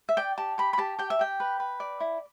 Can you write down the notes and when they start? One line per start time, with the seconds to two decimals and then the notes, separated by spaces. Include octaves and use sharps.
0.09 E5
0.17 D5 G5
0.38 G4 A5
0.58 G4 B5
0.73 B5
0.78 G4 A5
0.99 G4 G5
1.10 E5
1.19 G4 G5
1.40 B4
1.60 B4
1.80 D5
2.00 E4